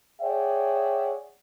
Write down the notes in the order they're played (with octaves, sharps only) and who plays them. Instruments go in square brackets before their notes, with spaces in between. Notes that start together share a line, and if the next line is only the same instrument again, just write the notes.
[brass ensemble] G#4 C#5 D5 E5 F#5 G5